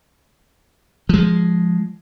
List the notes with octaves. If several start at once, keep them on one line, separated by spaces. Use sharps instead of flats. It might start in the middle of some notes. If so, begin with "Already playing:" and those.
F3 G#3